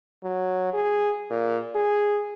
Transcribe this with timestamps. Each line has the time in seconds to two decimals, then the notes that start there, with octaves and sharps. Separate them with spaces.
0.23 F#3
0.74 G#4
1.30 A#2
1.75 G#4